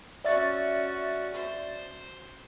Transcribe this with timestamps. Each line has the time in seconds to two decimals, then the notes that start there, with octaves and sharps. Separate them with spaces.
0.25 C#4 F#4 D5 E5 A6
1.34 C5